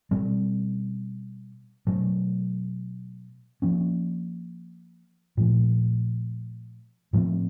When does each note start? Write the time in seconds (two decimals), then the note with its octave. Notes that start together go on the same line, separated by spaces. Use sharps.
0.11 B2 G3 C4
1.87 B2 F#3 A3
3.62 F3 A#3 C#4
5.37 A#2 F3 A3
7.13 A2 F3 A3 C4